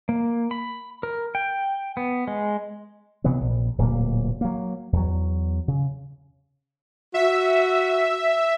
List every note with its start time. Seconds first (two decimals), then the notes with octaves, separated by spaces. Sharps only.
0.09 A#3
0.51 B5
1.03 A#4
1.35 G5
1.97 B3
2.28 G#3
3.24 C3 E3 F#3 B3
3.41 A#1
3.78 D1 A#2 F#3 A#3
4.41 F#3 A#3
4.93 E2 F#3
5.68 C#3
7.14 F#4 E5